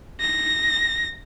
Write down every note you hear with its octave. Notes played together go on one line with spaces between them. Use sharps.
A#6